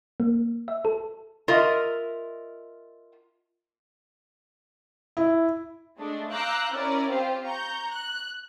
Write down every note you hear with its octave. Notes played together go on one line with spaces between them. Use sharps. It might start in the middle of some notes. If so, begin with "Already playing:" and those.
A#3
E5
A4
F4 A#4 D#5 E5
E4
G#3 A3 D4
F5 A#5 D6 E6 F#6 G6
C#4 E4 A#4 D5
C4 F4 G4 C5
A#5 C#6 G6
F#6